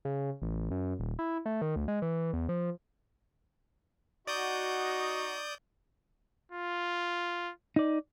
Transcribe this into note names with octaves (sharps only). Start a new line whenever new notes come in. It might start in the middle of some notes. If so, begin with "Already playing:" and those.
C#3
A1
F#2
D#1
E4
A3
D#3
D2
G#3
E3
E2
F3
D#4 F#4 D5 D#5 C#6 D#6 G6
F4
D#4 D5